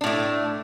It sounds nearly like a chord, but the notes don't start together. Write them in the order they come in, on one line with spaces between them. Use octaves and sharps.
D4 A2 A3